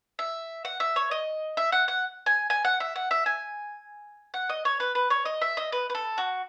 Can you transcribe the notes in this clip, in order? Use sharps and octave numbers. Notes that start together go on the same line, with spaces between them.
E5
F#5
E5
C#5
D#5
E5
F#5
F#5
G#5
G#5
F#5
E5
F#5
E5
G#5
F#5
D#5
C#5
B4
B4
C#5
D#5
E5
D#5
B4
B4
A4
F#4